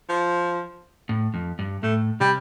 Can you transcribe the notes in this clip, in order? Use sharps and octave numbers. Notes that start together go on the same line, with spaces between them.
F3
A2
F2
G2
A2 A3
C3 G3